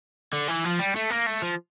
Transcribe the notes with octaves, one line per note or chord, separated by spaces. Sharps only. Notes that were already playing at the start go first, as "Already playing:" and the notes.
D3
E3
F3
G3
A3
A#3
A3
F3